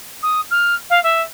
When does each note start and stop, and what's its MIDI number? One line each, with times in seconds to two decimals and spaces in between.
0.23 0.41 87
0.51 0.75 89
0.89 1.02 77
1.03 1.22 76